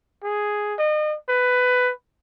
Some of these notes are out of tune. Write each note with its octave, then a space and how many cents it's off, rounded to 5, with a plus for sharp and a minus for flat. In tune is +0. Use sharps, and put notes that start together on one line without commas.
G#4 +5
D#5 -35
B4 +15